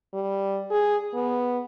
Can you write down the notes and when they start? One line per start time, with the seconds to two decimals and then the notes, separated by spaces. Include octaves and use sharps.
0.14 G3
0.71 G#4
1.14 B3